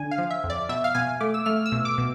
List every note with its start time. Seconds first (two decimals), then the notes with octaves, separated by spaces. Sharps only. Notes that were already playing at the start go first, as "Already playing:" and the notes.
Already playing: D3 G#5
0.11 F5
0.18 F3
0.30 E5
0.44 F2
0.50 D5
0.69 B2 E5
0.84 F5
0.95 B2 G#5
1.21 A3 D6
1.34 E6
1.46 A3 F6
1.66 E6
1.72 B2
1.85 D6
1.98 B2